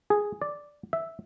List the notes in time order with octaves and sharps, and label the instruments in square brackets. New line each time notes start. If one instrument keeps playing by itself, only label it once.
[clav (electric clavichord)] G#4
D5
E5